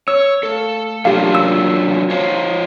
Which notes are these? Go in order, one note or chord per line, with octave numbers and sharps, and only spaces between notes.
C#5 E6
A3 A4 F5
C#3 F3 F#3 A#3 D4 F4 G4 F5
E6
F3 D#4 F4 C5 C#5